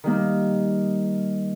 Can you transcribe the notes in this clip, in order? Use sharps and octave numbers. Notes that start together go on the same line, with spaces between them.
D#3 G3 A#3